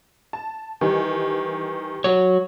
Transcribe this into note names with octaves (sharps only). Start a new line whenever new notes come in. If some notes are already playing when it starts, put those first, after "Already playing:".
A5
D#3 E3 G3
F#3 C#5